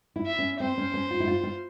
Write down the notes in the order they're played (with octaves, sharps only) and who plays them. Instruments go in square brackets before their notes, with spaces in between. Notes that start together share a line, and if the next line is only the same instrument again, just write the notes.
[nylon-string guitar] E4
[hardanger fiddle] E5
[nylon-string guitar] C#4
[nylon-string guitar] C4 [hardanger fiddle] C5
[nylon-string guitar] C#4
C#4
F4
E4
F4
F4